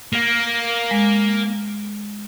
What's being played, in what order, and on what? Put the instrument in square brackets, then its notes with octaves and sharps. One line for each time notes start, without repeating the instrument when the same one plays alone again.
[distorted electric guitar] A#3
[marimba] G#3